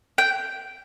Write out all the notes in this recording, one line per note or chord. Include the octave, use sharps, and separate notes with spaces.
G5